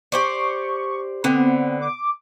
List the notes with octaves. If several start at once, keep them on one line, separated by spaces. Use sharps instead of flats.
G4 C5 D5 C#6
D3 B3 C4
D6